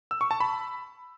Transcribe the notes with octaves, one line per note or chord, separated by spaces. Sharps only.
E6
C#6
A5
B5